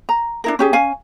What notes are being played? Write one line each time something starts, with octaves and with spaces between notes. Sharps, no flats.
A#5
D4 E4 A#4
C#4 G4 G#4
C#4 F5 G#5